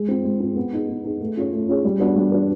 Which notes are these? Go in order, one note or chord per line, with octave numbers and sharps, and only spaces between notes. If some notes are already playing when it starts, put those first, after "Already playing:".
Already playing: G#3
C4 F4
G#3
C4 F4
B3
D#4 G#4
B3
D#4 G#4
A3
C#4 F4 G#4 C#5
A3
C#4 F4 G#4 C#5
G3
B3 D4 F#4 B4
G3
B3 D4 F#4 B4